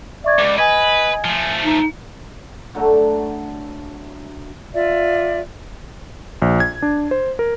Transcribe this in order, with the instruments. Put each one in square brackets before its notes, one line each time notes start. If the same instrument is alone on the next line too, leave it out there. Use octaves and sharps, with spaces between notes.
[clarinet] D5 [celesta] E5 C#6 G#6
[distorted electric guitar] C#2 [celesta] D6
[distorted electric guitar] B4 [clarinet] D#5 [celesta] G#5 G#6
[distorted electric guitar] F3 A3
[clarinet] D#4
[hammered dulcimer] D3 F#3 A3
[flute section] F4 D5 E5
[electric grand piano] A#1
G#6
D4
C5
A#4